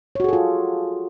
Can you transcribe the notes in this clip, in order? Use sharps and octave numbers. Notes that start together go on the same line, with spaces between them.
F4 F#4 G#4 A4 C#5